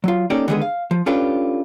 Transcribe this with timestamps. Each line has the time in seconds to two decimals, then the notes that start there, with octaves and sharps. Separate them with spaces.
0.04 F#3 F4
0.30 A#3 C#4 D#4 G4 A4 D5
0.48 D3 D#3 G3 G#3 B3 G#4
0.61 F5
0.91 F3
1.06 C#4 D4 F4 G4 A4 B4